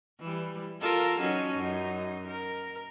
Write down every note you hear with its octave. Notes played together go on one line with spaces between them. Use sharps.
E3 G3
F4 A4 A#4
F#3 C#4 D#4
F#2 D#4
A#4